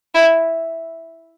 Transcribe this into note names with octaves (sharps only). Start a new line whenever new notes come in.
E4